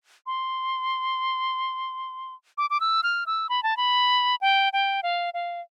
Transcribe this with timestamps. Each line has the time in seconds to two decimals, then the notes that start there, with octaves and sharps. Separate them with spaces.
0.26 C6
2.58 D6
2.70 D6
2.80 E6
3.03 F6
3.26 E6
3.49 B5
3.63 A5
3.77 B5
4.41 G5
4.73 G5
5.03 F5
5.34 F5